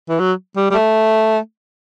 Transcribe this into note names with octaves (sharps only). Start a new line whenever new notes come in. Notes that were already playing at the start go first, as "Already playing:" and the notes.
E3
F#3
G3
G3
A3